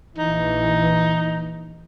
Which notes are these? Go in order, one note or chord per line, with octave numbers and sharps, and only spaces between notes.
A#1 E3 D#4